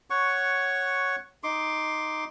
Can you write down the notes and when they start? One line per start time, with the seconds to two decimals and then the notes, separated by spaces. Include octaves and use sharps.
0.10 C#5 F#5 C#6
1.43 D#4 C6 D6